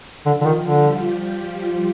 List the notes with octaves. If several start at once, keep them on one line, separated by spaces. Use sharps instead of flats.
D3 F3 F4
D3
D#3
D3 G3 G4